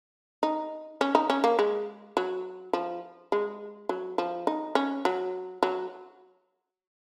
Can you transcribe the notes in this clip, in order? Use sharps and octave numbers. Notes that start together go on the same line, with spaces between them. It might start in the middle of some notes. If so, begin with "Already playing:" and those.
D#4
C#4
D#4
C#4
A#3
G#3
F#3
F3
G#3
F#3
F3
D#4
C#4
F#3
F#3